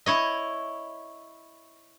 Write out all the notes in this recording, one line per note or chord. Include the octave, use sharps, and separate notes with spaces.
E4 C#5 D#5